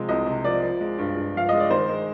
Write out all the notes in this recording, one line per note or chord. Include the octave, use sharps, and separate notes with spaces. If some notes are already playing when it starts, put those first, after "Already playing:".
Already playing: C3 F3 G#3
C2 D#5
C3
F3 D5
F3
G#3
G2
G2
F3 F5
G#3 D#5
D5
D#3 C5
G#3